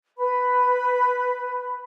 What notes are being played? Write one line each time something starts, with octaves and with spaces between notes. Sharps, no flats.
B4 B5